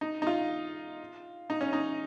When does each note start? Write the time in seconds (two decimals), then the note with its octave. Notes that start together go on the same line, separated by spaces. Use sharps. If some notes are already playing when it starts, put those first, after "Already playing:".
0.01 D#4
0.22 D#4
0.27 F4
1.50 D#4
1.61 C#4
1.73 D#4